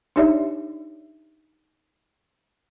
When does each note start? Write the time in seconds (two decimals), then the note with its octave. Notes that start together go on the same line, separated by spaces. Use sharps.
0.16 D4 D#4 G4 C#5 D5 E5